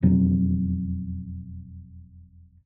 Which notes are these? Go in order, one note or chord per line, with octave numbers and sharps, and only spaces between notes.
E1 F2 B2 F#3